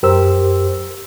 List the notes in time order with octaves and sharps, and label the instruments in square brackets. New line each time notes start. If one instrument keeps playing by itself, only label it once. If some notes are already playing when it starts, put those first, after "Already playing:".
[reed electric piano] F#2 G4 A#4 C5 E6